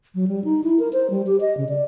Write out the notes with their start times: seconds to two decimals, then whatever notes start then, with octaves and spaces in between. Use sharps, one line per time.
0.15 F#3
0.28 G3
0.44 D#4
0.64 E4
0.79 A#4
0.93 C5
1.10 G3
1.26 G4
1.41 D#5
1.57 C#3
1.69 D5